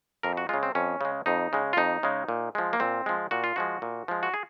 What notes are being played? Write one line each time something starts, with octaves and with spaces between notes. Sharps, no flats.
F2 A#4
F#4
C#3 G#3 F4
C4
F2 C#4
C#3 G#3
F2 D#4
C#3 G#3
F4
F2 D#4
C#3 G#3
A#2
F3 G#3
A#3
A#2 C4
F3 G#3
A#2 F#4
F4
F3 G#3 F#4
A#2
F3 G#3
F#4
G#4